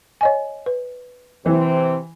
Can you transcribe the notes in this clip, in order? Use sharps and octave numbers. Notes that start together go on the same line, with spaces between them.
C#5 D#5 G#5
B4
C3 E3 C4